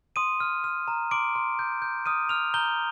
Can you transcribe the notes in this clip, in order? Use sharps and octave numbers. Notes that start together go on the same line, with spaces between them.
C6 D#6 D#7
F6
F6
A#5
C6 D6 D7
C6
G6
G6
D#6 F6 D#7
F6 F7
A#5 G6 G7